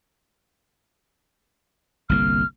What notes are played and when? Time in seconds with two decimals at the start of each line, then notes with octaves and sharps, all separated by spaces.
2.09 G1 C2 A#3 F6